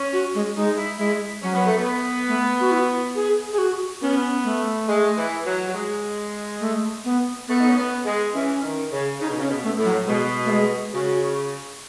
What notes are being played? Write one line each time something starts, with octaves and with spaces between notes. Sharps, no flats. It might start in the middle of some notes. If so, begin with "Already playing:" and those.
Already playing: C#4
F#4
G#3
G#3 D#4
E4
G#3 E4
F#3 C#4
B3
A3
B3
A3
F#4
E4
G#4
G#4
F#4
B3 C#4
A3
G#3
E3
F#3
F#3
G#3
A3
B3
A3 B3
D#4
C#4
B3
G#3
E3 C#4
D#3
C#3
C#3 D#4
B2
C#3
C#4
B2
A3
A2
F#3
B2 G#3
A3
G#3
C#3 F#4